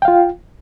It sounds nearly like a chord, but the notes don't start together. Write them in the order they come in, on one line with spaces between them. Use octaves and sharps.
G5 F5 F4